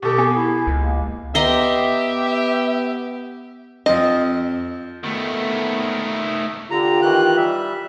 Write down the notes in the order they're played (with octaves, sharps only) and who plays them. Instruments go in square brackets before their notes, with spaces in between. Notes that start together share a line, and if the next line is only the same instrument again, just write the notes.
[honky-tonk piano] B2 A4 [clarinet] G4
[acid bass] B3 [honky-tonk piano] G#4
[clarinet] E4
[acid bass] C#2
[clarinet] A#3
[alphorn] B3 [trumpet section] G4 [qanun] D#5 A#5 C6 [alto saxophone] E5
[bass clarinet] F2 [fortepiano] F3 C4 [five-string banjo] D#5
[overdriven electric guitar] D#3 A3 [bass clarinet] B3
[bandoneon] D3 A#5 [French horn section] F4 G4
[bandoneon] D#3 E3 F#6
G3 E5